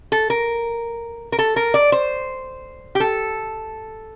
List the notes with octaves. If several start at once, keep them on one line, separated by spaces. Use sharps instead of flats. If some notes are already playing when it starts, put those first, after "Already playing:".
A4
A#4
A#4
A4
A#4
D5
C5
G4
A4